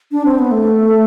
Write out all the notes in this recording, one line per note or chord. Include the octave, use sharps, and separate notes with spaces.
D4
C4
B3
A3